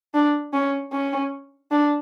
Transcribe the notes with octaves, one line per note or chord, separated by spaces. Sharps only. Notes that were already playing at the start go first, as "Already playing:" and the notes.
D4
C#4
C#4
D4